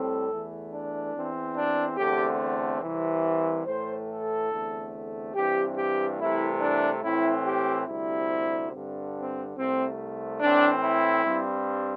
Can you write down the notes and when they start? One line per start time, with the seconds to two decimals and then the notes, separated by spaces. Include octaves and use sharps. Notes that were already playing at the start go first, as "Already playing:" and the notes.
Already playing: A2 G3 C4 A4
0.29 E2 E3 A3
0.71 D4
1.13 E2 E3 C4
1.55 D4
1.97 E2 D3 A3 C4 G4
2.82 C2 C3 E3
3.65 A2 E3 A3 C5
4.07 A4
4.50 E2 D3 A3 C4
5.34 G2 E3 C4 G4
5.76 G4
6.18 C2 C3 E3 A3 E4
6.61 D4
7.03 A2 E3 C4 E4
7.45 G4
7.86 D2 C3 G3 C4 E4
8.71 G2 D3 C4
9.14 C4
9.56 C2 C3 A3 C4
10.40 A2 E3 C4 D4
10.82 E4
11.24 G2 G3 C4